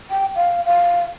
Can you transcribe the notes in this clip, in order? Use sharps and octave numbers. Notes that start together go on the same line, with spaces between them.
G5
F5
F5